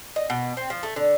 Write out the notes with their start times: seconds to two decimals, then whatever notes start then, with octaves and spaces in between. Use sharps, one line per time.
0.16 D#5
0.30 B2
0.57 C4
0.70 F3
0.83 A3
0.96 D3